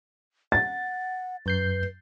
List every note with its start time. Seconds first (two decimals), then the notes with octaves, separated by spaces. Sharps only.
0.52 F#5 A6
1.46 F#2 B4 G6 C7